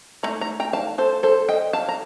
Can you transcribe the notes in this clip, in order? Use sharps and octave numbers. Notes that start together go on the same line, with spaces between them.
F3 A3 D#4 A#5
A#5
G5 A#5
F5 A5
A4 C5
A4 C5
D#5 G5
F5 A5
A#5